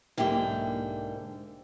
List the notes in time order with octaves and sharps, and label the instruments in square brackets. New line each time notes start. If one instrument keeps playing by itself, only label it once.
[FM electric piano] B1 [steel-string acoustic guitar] G#2 D3 G5 [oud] A#3 E4 G4